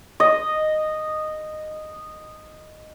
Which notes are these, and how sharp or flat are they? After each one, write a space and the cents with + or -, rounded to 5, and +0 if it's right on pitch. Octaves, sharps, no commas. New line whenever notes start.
D#5 -10